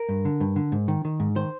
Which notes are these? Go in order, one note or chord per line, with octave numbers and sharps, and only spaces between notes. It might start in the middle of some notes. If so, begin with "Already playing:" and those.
Already playing: A#4
G2
D3
G2
D3
G#2
D#3
D#3
G#2
D#3 C5